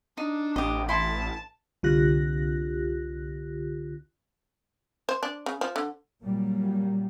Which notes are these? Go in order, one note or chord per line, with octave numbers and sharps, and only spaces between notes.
D4 D#4
A1 G4 D#5
E4 A5 C6
C2 D3 F4 G4 F#6 A#6
C5
D4
C#3
F3
D3
A#2 F#3 G3 A#3